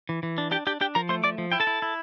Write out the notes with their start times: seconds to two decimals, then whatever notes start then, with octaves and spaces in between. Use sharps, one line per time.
0.09 E3
0.23 E3
0.38 D4
0.51 D4 G4 G5
0.67 D4 G4 G5
0.81 D4 G4 G5
0.95 F3 A#4 A#5
1.09 A3 C5 C6
1.24 F3 D5 D6
1.38 F3
1.52 E4 G5
1.60 A4 A5
1.67 E4
1.82 E4